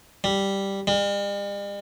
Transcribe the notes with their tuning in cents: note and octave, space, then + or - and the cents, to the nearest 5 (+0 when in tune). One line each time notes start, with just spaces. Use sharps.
G3 +0
G3 +45